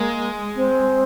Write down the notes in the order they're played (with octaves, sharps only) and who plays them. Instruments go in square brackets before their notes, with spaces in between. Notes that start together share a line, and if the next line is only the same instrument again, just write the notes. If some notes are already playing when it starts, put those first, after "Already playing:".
Already playing: [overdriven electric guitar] G#3 [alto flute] A#3
[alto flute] C4